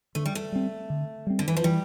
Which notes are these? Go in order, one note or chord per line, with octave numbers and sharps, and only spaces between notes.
D3 A3
G3
A3
G3 C4
D3
G3 C4
D3
E3
F3
E3 G3